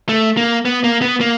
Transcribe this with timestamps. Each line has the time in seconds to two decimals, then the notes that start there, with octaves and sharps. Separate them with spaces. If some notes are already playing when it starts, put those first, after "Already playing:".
0.09 A3
0.37 A#3
0.65 B3
0.84 A#3
1.02 B3
1.21 A#3